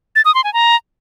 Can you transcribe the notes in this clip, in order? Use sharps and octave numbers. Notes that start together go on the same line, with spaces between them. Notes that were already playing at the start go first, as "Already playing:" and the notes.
A6
D#6
C6
G#5
A#5